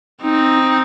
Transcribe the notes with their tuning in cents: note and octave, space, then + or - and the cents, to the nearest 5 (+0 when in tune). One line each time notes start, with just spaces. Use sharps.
C4 +0 D#4 +0